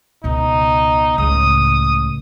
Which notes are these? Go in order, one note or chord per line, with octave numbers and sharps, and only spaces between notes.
C#2 B2 D#4
C#2 A2 D#6